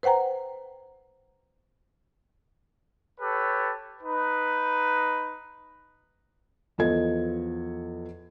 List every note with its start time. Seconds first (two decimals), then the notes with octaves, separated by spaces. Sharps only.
0.03 B4 C5 F#5 G5 A#5
3.20 G4 A4 B4 C#5
4.02 D#4 B4
6.78 E2 F3 A4 D#5 G#6